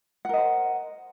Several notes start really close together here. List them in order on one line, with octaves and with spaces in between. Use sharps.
F#5 A#4 D#5 C5